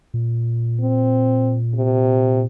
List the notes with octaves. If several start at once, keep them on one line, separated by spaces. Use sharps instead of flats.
A#2
C4
C3